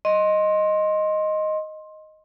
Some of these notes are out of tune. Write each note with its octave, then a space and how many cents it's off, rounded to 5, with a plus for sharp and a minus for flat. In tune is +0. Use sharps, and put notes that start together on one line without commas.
D#5 +0 C6 +20